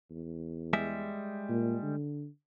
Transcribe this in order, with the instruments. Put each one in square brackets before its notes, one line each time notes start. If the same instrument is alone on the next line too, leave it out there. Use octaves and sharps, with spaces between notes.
[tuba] E2
[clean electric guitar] G3 G#3 E5
[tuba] A#2
D3